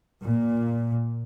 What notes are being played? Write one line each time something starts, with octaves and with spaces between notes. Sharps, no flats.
A#2